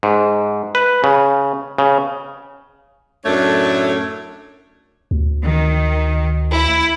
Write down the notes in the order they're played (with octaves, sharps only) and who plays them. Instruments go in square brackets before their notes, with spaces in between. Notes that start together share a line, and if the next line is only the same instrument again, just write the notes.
[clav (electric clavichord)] G#2
B4
C#3
C#3
[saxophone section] F#2 A2 A3 D4 A4 C#5
[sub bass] D2
[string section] D#3
E4